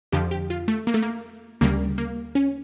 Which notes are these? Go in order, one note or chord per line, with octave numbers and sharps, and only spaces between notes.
F2 D3 F3 G4
G4
F4
A3
A#3
A3
A#3
D2 C#3 G3 A#3
A#3
C#4